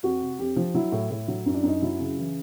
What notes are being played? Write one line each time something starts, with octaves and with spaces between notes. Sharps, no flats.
F2 F#4
C3
F2 G4
F3
F#3 E4
A2
A2
F#3
F#2
D4
F#2 D#4
F#3 E4
C#3
E3